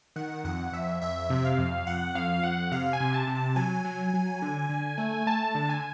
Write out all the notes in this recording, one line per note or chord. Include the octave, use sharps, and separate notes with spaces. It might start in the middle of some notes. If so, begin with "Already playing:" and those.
D#3 F#5
F2 F#5
F2 E5
F2 E5
C3
F5
F2
F2 F#5
F2 F5
F2 F#5
C3 F5
G#5
C3
A5
C3
A5
F#3 G#5
F#3
F#3
D3
D3
A3
A3 A5
D3
G#5